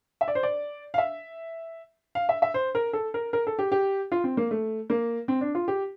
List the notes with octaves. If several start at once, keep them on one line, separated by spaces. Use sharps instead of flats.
E5
D5
C5
D5
F5
E5
F5
E5
E5
C5
A#4
A4
A#4
A#4
A4
G4
G4
F4
C4
A#3
A3
A#3
C4
D4
F4
G4